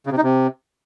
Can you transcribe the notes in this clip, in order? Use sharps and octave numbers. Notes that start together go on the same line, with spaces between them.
C#3
C3
D#4
C3